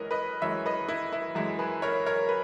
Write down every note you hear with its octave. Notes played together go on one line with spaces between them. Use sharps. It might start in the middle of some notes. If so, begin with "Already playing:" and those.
Already playing: F#2 E3 G#3 A#4 B4 C#5 D#5
B4 D#5
F#2 E3 G#3 C#5 E5
B4 D#5
E4
E4
F#2 E3 G#3 E4
G#4 B4
A#4 C#5
A#4 C#5
B4